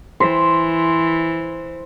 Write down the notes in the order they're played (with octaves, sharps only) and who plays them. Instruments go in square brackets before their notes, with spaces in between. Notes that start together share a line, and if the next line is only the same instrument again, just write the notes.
[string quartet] E3 [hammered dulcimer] C5